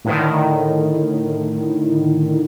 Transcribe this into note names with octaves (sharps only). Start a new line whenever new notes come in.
A2 D3 D#3